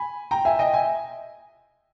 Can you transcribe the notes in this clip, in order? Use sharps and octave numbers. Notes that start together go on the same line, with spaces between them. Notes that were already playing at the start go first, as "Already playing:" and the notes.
Already playing: G#5 B5
G5 A#5
E5 G#5
D#5 G5
E5 G#5